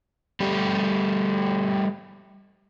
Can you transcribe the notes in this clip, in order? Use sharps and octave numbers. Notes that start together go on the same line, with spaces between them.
G3 A3 G4